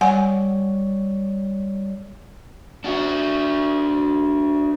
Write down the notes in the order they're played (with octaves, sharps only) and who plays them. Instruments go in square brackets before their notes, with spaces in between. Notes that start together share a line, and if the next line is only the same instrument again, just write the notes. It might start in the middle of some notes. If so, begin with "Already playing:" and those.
[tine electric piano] G3 C#5 D5 [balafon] F#5 G#5
[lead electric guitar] D4 F#4